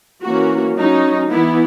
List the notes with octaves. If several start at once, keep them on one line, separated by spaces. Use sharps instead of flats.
E3 A#3 C#4 F#4
F#3 C#4 D#4
E3 B3 E4